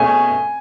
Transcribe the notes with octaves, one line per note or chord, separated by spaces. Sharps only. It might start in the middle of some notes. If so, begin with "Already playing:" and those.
Already playing: B2 A3 C#4 G#4 G#5